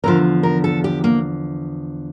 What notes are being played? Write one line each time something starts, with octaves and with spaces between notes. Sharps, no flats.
E2 D3 F3 A#4
A#4
A4
G4
A#3